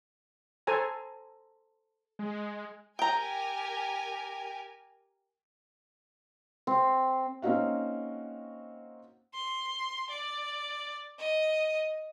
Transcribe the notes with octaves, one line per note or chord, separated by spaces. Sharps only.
A4 C5 G#5 A#5
G#3
G4 A#4 G5 G#5 A#5
C4
A#3 C4 C#4 D#4 F#4 F5
C6
D5
D#5